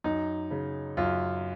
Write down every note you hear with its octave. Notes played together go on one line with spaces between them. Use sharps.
F#2 D#4
C#3
F#2 F4